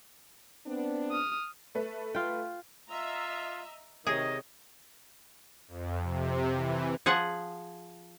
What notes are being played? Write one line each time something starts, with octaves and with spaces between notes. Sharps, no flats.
B3 C4 D4
D#6 F6
A3 A4 B4
F4 G5
F4 D#5 E5 A#5
C3 D#3 G#4 C#5 D#5
F2
C3
E3
F3 G#4 F#5